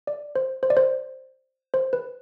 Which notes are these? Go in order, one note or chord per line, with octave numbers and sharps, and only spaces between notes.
D5
C5
C5
D5
C5
C5
B4